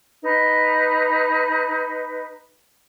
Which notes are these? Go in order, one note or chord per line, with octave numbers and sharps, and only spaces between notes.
D#4 B4